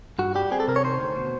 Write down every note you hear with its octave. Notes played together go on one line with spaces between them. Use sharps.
G2 F#4
G3 G4
C4 G#4
A4
C3 A#4
C#5
D#3 C5
D2
B2